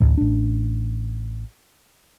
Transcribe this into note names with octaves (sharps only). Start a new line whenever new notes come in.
A1 D2
A1 D4